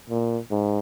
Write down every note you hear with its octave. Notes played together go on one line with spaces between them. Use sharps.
A#2
G#2